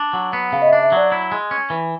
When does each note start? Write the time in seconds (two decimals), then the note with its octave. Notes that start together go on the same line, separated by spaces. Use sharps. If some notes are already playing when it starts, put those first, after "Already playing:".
Already playing: D4
0.13 F#3
0.33 B3
0.52 C#3 F5
0.62 D#5
0.67 E5
0.73 D4
0.83 E5
0.92 F#3 D5
1.12 E4
1.32 G#3
1.51 C#4
1.70 E3